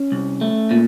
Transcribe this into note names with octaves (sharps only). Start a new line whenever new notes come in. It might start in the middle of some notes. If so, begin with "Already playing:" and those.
Already playing: C#4
C2
A3
A#2